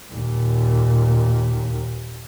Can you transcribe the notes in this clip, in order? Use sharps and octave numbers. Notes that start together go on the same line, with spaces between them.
D#2 A#2